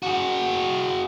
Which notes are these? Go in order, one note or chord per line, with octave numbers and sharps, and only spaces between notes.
F#4 G#4